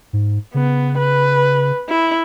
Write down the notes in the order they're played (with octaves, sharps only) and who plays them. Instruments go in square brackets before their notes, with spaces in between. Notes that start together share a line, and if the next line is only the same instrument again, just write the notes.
[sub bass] G#2
[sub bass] C#3 [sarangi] B3
[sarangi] B4
E4